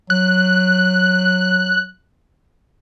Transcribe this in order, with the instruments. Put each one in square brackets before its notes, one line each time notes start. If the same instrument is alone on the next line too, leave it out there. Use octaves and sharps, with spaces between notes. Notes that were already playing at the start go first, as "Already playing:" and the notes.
[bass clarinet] F#3 [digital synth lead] F#6